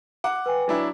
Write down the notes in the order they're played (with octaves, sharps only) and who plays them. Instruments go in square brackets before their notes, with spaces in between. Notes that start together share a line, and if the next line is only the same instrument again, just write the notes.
[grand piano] F#5 D6
[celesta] B4 G5 G#5
[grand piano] F#3 D4 E4